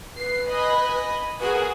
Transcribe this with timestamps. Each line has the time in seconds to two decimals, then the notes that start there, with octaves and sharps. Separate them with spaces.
0.17 B4 C7
0.49 D#5 G#5 B5
1.40 F#4 G#4 A#4 B4